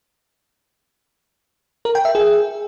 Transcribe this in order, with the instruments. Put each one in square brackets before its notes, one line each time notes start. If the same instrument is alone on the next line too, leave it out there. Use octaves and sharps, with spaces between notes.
[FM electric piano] A#4
G5
E5
G#4